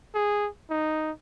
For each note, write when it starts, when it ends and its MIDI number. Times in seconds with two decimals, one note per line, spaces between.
0.14 0.48 68
0.70 1.11 63